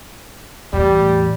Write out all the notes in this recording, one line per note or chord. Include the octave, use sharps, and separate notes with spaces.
E2 A2 G3